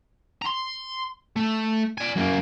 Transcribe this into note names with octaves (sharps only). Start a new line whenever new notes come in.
A#5 C6
A3
D5 G#5
F#2 A#3